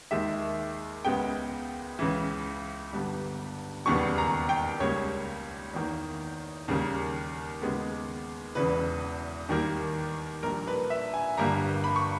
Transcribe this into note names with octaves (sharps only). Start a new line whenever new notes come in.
D#2 D#3 G#3 E5
C#2 C#3 G#3 B3 G5
C#2 C#3 E3
G1 G2 G3 B3
E1 D#2 C#3 G3 B3 C#6
A#5
G5
C#2 C#3 G3 A#3 C#5
E2 D#3 A#3
D#2 C#3 G3 A#3
D#2 C#3 G#3 B3
E1 E2 C#3 E3 B4
D#2 D#3 G3 A#3
A#1 A#2 G3 A#4
B4
E5
G#5
G1 G2 G3 A#3 A#5
B5
C#6